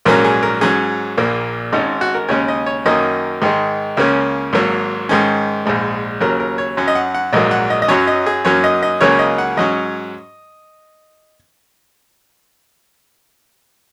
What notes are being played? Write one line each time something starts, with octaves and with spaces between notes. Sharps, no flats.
A#1 G#2 F#3 A#3 C#4 A#4
G#4
A#4
G#2 F#3 C#4 G#4
A#1 A#2 A#3
G#1 G#2 G#3 C#4 D#4
F#4
A#4
D#2 C#3 G#3 C#4 C#5
D#5
C#5
F#2 D#3 A#3 C#4 D#5
G#2 D#3 G#3
C#2 C#3 A#3 C#4
G#1 G#2 F#3 A#3
G#2 D#3 G#3 C#4
A#1 G#2 G#3
D#2 C#3 F#3 A#4
A#4
C#5
F#2 F#3 C#4
D#5
F#5
F#5
A#1 G#2 F#3 A#3 D#5
F#5
D#5
D#5
F#2 F#3 C#4 C#5
D#5
G#4
F#2 F#3 A#3 C#4 C#5
D#5
D#5
C#2 C#3 F#3 A#3 C#4 C#5
D#5
F#5
G#2 F#3 C#4 D#5